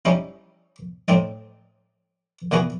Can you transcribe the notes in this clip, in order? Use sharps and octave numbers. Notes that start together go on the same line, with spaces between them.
G3 C#4 D#4 E4
A2 C4 D#4 D5
A#2 E3 B3 F#4 G#4